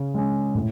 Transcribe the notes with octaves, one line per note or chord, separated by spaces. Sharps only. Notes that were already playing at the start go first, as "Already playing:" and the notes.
Already playing: C#3
G#3 C#4
A2